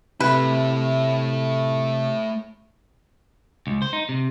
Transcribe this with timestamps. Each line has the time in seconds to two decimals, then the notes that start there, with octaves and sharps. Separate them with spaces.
0.20 C3 A3 E4 B4
3.67 C#2
3.82 C5
3.93 D#4
4.09 C3